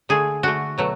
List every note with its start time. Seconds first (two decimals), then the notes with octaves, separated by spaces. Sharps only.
0.09 D3 A3 G#4
0.43 D3 A3 F#4
0.78 B2 F#3 A3